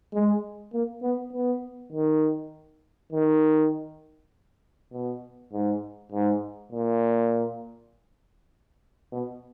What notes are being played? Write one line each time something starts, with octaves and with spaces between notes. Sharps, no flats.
G#3
A#3
B3
B3
D#3
D#3
B2
G#2
G#2
A#2
B2